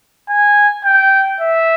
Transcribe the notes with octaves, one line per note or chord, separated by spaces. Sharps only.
G#5
G5
E5